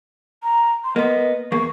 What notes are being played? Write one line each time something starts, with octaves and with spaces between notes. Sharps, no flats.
A#5
C6
A#3 B3 D#5
E2 A#3 C#6